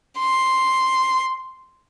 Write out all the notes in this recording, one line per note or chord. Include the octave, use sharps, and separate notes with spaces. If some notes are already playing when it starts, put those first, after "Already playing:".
C6